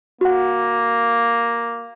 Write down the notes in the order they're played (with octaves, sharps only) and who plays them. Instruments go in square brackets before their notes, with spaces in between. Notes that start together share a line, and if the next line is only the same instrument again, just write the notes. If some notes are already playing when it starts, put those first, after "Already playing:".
[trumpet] A#3 [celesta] F#4 F#5